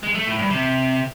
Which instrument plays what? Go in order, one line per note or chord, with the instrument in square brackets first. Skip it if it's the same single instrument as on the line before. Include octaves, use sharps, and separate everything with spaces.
[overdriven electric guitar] G#3
A3
A2
G2
C3